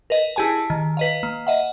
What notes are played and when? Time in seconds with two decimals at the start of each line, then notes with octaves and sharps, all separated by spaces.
0.10 A#4 B4 D#5
0.36 E4 G4 G#4 G#5 A5
0.70 D#3
0.97 B4 D#5 F5
1.23 A#3
1.47 D#5 E5 F#5